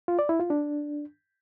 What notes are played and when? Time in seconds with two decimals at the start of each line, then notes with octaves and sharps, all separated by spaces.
0.08 F4
0.19 D5
0.29 E4
0.40 F4
0.50 D4